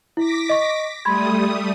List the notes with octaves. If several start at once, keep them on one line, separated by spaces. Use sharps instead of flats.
E4 D6 A#6 B6
D#5 C#6
G3 A3 B5 C6 D#6 G#6